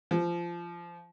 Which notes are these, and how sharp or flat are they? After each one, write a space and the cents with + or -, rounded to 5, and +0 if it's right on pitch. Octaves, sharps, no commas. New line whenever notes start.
F3 -20